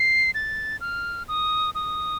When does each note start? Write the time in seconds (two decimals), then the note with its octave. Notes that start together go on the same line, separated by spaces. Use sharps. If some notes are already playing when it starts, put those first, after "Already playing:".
Already playing: C7
0.35 A6
0.81 F6
1.28 D#6
1.75 D#6